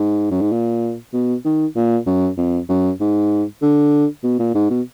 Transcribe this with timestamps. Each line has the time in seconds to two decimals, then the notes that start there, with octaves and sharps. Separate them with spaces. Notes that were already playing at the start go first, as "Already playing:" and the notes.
Already playing: G#2
0.31 F#2
0.41 G#2
0.52 A#2
1.13 B2
1.45 D#3
1.76 A#2
2.07 F#2
2.37 F2
2.69 F#2
3.00 G#2
3.62 D3
4.24 B2
4.39 A#2
4.55 G#2
4.70 B2